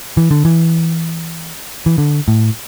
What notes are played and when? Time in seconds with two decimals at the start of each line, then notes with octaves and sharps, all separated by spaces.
0.17 E3
0.31 D3
0.45 E3
1.86 E3
1.98 D3
2.28 A2